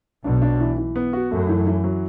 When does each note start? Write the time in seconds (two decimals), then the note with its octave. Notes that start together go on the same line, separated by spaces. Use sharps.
0.24 B1 B2 D4
0.42 D4
0.60 E3
0.78 E3
0.96 B3
1.13 F#4
1.31 F#2 A3
1.49 E3
1.67 E3
1.84 F#3